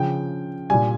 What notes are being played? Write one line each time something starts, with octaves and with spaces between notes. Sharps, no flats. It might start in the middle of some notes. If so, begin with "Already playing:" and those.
Already playing: C#3 F3 G5
A#2 G3 G#5